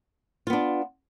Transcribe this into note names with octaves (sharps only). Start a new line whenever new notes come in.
B3 D4 F4